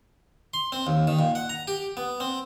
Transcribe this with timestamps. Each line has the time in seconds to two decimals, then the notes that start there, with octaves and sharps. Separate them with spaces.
0.54 C6
0.72 C4
0.87 D#2
1.07 D#3
1.19 A#2
1.35 F#5
1.49 A#5
1.68 G4
1.97 B3
2.20 C4